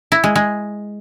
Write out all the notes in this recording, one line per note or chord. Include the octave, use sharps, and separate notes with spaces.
E4
G#3
G#3